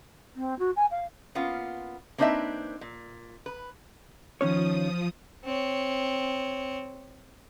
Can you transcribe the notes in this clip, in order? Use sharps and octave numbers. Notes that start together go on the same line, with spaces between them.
C4
F#4
G#5
F5
A#3 B3 C#4 F4
A#3 C4 D4 D#4 B4 E5
A#2
B4
D#3 F3 C#4 C#5 D#6
C4 C#5